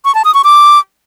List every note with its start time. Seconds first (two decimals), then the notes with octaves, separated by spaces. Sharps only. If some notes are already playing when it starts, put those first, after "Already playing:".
0.05 C#6
0.15 A5
0.25 D#6
0.34 C#6
0.44 D6